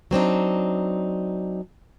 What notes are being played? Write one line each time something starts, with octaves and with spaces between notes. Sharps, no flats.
F#3 C4 D4 D#4